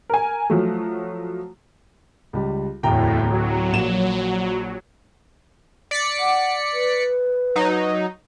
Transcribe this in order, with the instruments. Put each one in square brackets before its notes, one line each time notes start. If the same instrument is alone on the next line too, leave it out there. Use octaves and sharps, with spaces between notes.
[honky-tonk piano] A#4 G#5
F3 F#3 A3
[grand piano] C#2 G3
[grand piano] D1 G5 A#5 [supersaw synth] E2 A2
[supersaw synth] F#3
[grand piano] A#1 A#3 E7
[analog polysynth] D5 B6 C#7
[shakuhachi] F#5
B4
[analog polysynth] F#3 D#4